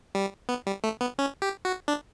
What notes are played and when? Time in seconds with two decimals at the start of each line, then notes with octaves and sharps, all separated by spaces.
0.15 G3
0.49 B3
0.67 G3
0.84 A3
1.01 B3
1.19 C#4
1.42 G4
1.65 F#4
1.88 D4